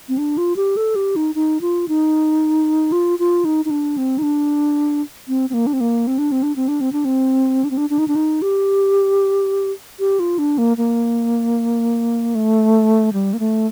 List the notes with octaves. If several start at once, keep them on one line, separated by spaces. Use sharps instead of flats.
C4
D4
F4
G4
A4
G4
D#4
D#4
F4
D#4
F4
F4
D#4
D#4
D4
C4
D#4
D4
C4
C4
A#3
D4
C4
A#3
C4
D4
C4
D4
C4
D4
C4
D4
C4
D4
C4
D4
D4
D#4
D4
D#4
G4
G4
F4
D4
A#3
A#3
A3
G3
A#3
A3